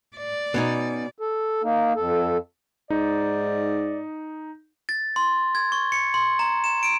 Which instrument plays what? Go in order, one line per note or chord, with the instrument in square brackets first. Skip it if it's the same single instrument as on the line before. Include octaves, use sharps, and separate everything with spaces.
[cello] D5
[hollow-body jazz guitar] B2 C#4 D#4
[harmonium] A4
A#3 D#4
F2 A4
[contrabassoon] G#2 [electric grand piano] D#4 [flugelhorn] D5
[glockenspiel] A6
C6
G#6
C#6
C#7
C6
A#5
E7
D7